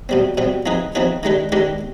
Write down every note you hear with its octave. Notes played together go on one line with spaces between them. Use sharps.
B2 G3 C4
B2 G3 C4
F3 C4 D#4 G#4 B4
F3 C4 D#4 G#4 B4
D#3 G#3 D4 G4 B4
D#3 G#3 D4 G4 B4